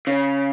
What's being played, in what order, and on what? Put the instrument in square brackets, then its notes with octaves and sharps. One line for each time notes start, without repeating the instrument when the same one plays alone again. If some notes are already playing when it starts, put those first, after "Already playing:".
[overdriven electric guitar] C#3